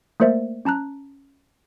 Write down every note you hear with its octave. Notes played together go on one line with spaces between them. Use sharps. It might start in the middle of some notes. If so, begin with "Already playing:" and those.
A3 A#3 A#4 C5 D5 E5
C#4 A5 A#5 F#6